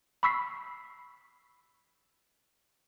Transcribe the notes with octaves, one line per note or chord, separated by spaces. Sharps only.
B5 C#6 E6 B6 C7